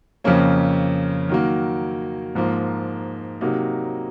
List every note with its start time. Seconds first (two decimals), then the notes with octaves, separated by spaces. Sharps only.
0.24 F2 C#3 F3 A#3 C#4
1.29 D#3 F#3 A#3
2.35 G#2 F3 A#3
3.41 C3 F#3 A#3 D#4